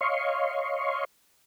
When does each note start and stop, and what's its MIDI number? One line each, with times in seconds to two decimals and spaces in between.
0.01 1.05 73
0.01 1.05 75
0.01 1.05 77
0.01 1.05 84
0.01 1.05 85